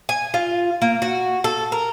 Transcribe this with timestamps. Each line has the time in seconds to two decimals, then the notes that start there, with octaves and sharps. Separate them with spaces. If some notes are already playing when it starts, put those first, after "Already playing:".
0.09 G#5
0.34 F4
0.82 A#3
1.02 F#4
1.44 A4
1.72 A#4